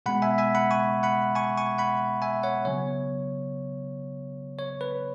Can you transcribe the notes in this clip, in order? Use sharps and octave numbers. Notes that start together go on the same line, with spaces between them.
B2 G#3 B3 F#5 B5
E5 G#5
E5 G#5
F#5 B5
G#5 C#6
F#5 B5
G#5 C#6
G#5 C#6
F#5 B5
E5 G#5
C#5 F#5
C#3 F#3 B3 C#5
C#5
B4